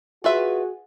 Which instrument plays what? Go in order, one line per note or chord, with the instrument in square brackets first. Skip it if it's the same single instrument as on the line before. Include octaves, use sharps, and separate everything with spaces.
[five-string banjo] F4 B4 E5 [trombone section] F#4 G#4